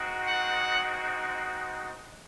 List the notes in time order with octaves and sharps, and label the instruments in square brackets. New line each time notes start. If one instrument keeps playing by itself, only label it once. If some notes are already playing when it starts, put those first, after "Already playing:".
Already playing: [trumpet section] G#3 C4 D#4 F#4
F#5